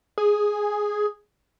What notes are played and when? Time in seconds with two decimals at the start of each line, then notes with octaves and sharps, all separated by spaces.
0.18 G#4